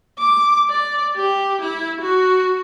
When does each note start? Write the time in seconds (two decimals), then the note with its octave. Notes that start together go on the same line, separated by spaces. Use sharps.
0.19 D6
0.70 D5
1.16 G4
1.61 E4
2.01 F#4